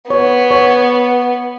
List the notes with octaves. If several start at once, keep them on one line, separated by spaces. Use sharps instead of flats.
B3 C#5
C#5